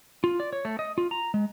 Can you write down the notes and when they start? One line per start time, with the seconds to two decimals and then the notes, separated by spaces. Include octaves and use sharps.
0.24 F4
0.40 D5
0.53 C#5
0.65 A3
0.79 D#5
0.98 F4
1.11 A#5
1.34 G#3